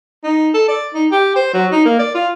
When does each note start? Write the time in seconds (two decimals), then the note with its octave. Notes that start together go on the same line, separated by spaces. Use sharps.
0.24 D#4
0.54 A4
0.68 D5
0.94 D#4
1.11 G4
1.36 C5
1.53 F#3
1.72 D#4
1.85 A#3
1.99 D5
2.14 F4